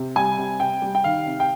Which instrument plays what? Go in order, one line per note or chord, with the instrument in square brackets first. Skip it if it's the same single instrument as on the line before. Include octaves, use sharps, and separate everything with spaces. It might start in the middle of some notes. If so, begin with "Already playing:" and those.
Already playing: [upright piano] C3
G3 G#5
C3
C3 G5
G3
G5
D#3 F5
C3
G5